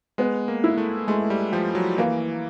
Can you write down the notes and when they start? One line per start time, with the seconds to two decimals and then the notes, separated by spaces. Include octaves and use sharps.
0.18 G#3 B3
0.48 A#3
0.64 E4
0.78 A3
1.08 G#3 A3
1.30 G3
1.52 F3 G4
1.75 F#3
1.98 E3 A#3